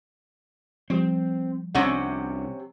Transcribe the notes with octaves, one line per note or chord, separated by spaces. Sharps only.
F3 G3 C4
C2 C3 C#4 D4 F#5